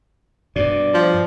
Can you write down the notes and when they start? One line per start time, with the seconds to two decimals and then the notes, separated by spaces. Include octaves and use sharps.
0.56 G2 B2 D5
0.94 F3